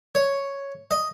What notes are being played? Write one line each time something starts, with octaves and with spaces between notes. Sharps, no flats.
C#5
D#5